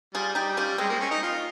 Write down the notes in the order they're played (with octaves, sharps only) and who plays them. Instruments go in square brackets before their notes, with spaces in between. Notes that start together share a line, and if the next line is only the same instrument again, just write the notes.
[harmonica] G3 [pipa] F4 G#4
[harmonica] G3 [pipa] D#4 G4
[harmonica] G3 [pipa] C#4 F4
[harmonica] G#3 [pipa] C4
[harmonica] A#3
C#4
D#4
F4